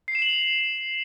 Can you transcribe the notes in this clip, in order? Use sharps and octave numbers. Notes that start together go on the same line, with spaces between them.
C7
E7
F#7
F7